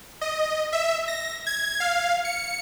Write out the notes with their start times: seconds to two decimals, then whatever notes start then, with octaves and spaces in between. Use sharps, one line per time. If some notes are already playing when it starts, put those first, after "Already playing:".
0.21 D#5
0.73 E5
1.08 A#6
1.46 G#6
1.80 F5
2.25 C#7